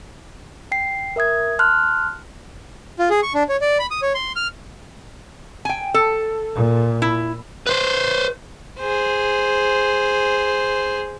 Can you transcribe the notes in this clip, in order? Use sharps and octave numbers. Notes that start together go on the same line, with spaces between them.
G5 C7
A#4 E5 D#6 G#6
A5 C6 F6 F#6
F4
G#4
C#6
D4
C#5
D5
B5
D#6
C#5
C6
F6
G5 G#5
A4
A#2
E4
B4 C5
G#4 C5